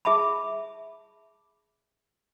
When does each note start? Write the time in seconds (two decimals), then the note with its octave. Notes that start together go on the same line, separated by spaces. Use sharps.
0.05 G#4 E5 A5 B5